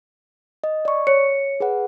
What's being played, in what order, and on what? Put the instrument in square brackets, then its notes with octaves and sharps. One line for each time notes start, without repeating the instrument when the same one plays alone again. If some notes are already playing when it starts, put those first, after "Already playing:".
[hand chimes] D#5
D5 C#6
[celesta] C#5 [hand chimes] C#7
[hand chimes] G#4 B4 F#5